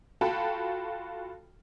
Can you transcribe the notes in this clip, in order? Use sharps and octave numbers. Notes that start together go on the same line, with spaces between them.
F4 F#4 A4 G5 A5 B5